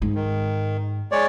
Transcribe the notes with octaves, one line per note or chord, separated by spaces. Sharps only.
G#2
D#3
G#3 C#5 D5